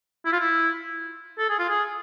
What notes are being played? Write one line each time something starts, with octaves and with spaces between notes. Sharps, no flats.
E4
F4
E4
A4
G#4
F4
G#4